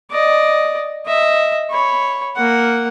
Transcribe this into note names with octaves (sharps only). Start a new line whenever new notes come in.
D5 D#5
D#5 E5
C#5 B5
A#3 F#5